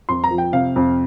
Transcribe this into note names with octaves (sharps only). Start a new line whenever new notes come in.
F2 C6
A#5
F3
G5
C3 F5
F2